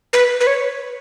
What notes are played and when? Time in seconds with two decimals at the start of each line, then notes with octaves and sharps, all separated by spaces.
0.13 B4
0.40 B4
0.47 C#5